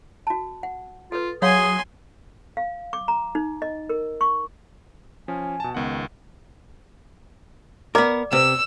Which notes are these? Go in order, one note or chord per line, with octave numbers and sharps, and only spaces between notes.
F#4 A5
F#5
F4 A4 B4
F#3 G#4 C#5 F5 F#5 G#5 C6
F5
D6
A#5
D#4
D#5
A#4
C#6
F3 C#4 G#5
B2 A5
C#2 D#3 B3 F#5
B3 A#4 D5 D6
C3 B4 E6